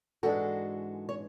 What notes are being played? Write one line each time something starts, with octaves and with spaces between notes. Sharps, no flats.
G#2 E3 G#3 D4 F#4 A4
C#5